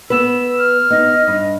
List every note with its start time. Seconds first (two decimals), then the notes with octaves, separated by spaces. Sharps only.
0.10 B3 B4 E6
0.59 F6
0.90 B3 D#4 D#5
1.28 G2